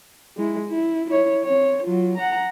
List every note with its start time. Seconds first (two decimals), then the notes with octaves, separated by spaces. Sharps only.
0.37 G#3 E4
0.69 E4
1.11 E4 C#5
1.44 C4 C#5
1.84 F#3 F4
2.18 F#5 A#5